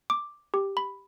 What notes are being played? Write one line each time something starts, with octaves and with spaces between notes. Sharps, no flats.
D6
G4
B5